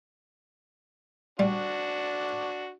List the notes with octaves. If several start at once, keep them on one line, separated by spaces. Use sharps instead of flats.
G3 D4 F#4